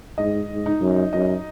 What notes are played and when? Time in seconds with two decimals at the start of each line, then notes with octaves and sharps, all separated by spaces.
0.18 G#2 D#5
0.50 G#2
0.66 D#4
0.81 F#2
1.13 F#2 D#5